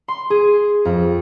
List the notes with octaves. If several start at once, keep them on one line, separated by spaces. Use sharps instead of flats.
C6
G#4
F2